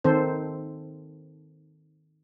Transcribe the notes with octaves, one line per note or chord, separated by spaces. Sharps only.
D#3 C4 A4 C5